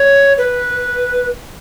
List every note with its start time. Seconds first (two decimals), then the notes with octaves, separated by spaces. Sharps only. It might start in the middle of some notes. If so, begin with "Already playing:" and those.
Already playing: C#5
0.38 B4